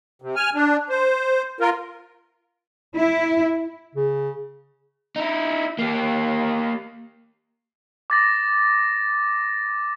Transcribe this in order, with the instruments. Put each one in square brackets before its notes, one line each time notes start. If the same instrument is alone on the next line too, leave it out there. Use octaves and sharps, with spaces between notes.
[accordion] C3
G#5 F6
D4
C5
F4 A#4
[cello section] E4
[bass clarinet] C#3
[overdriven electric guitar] D#4 E4
A#3 G4
[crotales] D6 A6 A#6